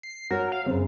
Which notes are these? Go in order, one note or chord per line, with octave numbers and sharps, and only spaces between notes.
C7
F#4 A#4 C#5
F5
F#2 C#3 C4